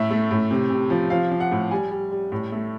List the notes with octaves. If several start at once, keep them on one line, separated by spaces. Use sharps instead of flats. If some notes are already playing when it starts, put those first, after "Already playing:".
Already playing: A2 E5
A3
A2
C3
C3
F3
F3 F5
F3
F#5
A2
G3 G#5
G3
G3
A2
A3